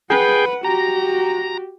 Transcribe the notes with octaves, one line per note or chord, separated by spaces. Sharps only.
G#4 B4 F#5 G5
F#4 G4 A#5